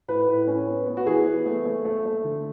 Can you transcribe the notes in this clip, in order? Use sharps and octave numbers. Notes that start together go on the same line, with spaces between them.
A2 B4
A2
C#4
B3
B3
F#4
E3 G#4
B3
A3
A3
A3
A3
D3